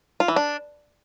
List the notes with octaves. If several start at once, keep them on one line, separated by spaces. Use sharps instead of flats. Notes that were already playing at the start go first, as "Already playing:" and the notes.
F4
E3
D4